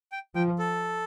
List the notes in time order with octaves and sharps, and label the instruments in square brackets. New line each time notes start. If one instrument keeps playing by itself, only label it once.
[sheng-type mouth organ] G5
[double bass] F3 [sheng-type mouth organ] G5
[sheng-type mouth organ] A4